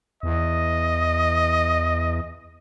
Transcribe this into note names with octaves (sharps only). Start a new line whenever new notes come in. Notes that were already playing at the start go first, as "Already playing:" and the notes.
E2 D#5